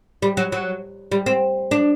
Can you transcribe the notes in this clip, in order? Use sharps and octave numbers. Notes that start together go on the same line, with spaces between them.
G3
F#3
F#3
G3
C4
D4